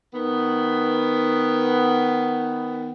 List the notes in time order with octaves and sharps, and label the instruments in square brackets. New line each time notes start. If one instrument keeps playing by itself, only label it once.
[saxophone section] D#3 B3